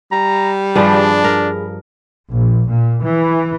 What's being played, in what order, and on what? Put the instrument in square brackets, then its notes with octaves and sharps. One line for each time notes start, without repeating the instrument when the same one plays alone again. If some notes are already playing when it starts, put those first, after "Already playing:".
[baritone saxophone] G3 [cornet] A#5
[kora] G2 F3 [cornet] D4 [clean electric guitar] G#4 B5
[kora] A#4
[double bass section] A#1
A#2
E3